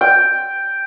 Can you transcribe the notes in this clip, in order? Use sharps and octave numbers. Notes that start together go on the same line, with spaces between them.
G5